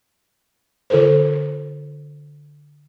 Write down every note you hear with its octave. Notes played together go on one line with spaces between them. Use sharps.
D3 F4 A4 A#4 C5